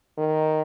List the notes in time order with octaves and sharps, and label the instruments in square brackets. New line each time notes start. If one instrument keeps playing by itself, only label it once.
[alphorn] D#3